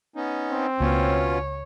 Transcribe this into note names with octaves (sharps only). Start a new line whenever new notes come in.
B3 C#4 D#4
C4
C#2 B2 A#3 C#4 F4 C#5